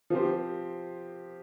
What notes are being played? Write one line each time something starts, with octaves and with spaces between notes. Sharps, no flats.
F3 C4 G4 C5